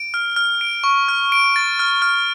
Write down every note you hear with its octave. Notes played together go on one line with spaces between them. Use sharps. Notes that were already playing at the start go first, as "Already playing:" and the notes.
Already playing: D7
F6
F6
D7
C#6
F6
D7
A6
F6
F6